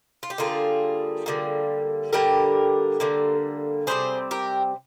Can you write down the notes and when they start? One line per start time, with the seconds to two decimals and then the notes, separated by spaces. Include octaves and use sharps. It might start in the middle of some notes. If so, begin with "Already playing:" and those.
0.23 F4
0.30 G4
0.38 D3 G3 A#3 F4 G#4
1.26 D3 G3 A#3
2.13 D3 G3 A#3 G4 A#4
3.00 D3 G3 A#3
3.87 C3 G3 C4 G#4 C5
4.31 G4 A#4